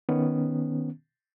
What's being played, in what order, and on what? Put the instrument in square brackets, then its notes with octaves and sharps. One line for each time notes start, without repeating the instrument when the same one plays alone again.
[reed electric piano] D#3 B3 C#4